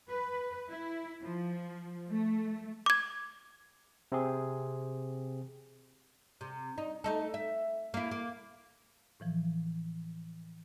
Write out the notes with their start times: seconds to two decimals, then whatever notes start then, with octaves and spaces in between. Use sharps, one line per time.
0.11 B4
0.70 E4
1.21 F3
2.11 A3
2.86 D6 G#6
4.12 C3 C4 G#4
6.41 C3
6.78 D#4
7.04 A3 D#4 A4
7.34 E5
7.94 A#3 E4
8.11 A#3
9.20 A2 E3 F3